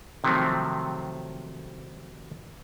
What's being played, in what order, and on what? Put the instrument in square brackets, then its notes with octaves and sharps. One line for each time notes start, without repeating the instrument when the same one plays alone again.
[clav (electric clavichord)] C3 D#3 F3 F#3 A3 C4